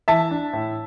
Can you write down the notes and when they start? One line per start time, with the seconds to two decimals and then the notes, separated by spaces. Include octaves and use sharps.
0.08 E3 E5 A5
0.31 D4
0.53 A2